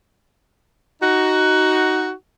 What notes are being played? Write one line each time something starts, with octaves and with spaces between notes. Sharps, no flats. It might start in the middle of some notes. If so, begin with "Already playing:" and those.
D#4 F#4